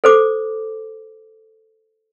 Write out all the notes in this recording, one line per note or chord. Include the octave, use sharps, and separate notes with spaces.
A4 C5 D6